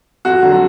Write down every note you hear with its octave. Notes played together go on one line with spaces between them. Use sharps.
F2 F#4
D3 F#3